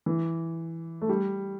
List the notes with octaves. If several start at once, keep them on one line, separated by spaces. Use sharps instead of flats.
E3
A3
G3